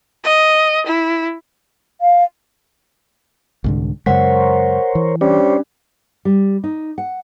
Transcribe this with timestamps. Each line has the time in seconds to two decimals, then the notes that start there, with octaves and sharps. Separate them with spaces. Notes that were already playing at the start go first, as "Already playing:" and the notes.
0.24 D#5
0.87 E4
2.01 F5
3.64 C2 G#2 D3
4.06 F#2 C#3 G#3 A#4 C5 C#5 F#5 B6
4.95 E3
5.21 G3 C#4 D4 C5 C#5
6.25 G3
6.64 D#4
6.98 F#5